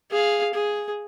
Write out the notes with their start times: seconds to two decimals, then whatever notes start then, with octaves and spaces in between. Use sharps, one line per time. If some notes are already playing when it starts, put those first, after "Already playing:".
0.10 G#4 F5
0.54 G#4